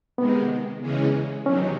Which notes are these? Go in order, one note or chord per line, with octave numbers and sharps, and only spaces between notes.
C3 D#3 G#3 B3
E2 C#3 E3 G#3 C#4
E2 C3 D#3 F#3 C#4